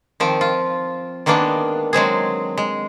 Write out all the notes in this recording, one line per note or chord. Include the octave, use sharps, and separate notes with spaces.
D#3 F3 C4
F4
D#3 G#3 A#3 B3 D4
F#3 G#3 C4 G#4
G#3